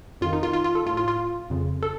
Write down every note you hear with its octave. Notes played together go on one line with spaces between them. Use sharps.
F2 D#3 F4
D#4
F4
F4
F4
A4
A2 F4
F4
F4
F2 C#3
A4